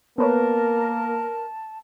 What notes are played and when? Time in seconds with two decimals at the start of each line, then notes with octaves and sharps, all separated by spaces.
0.18 A#3 B3 A#4 B4 C#5 A5